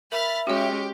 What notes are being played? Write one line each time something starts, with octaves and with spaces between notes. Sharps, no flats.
A#4 E5 B5 F6 A6
G#3 C#4 F#4 G4 C#5